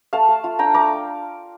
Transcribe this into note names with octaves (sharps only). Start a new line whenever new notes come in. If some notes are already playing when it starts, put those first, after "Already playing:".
A3 F5 A5
A3
F4
D4 G5 A#5
A3 A#5 D6